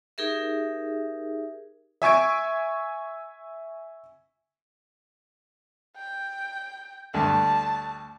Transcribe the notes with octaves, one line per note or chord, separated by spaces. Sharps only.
D#4 G4 G#4 A#4 E5
E5 G#5 C#6 G#6 D7
G5
D2 G2 A5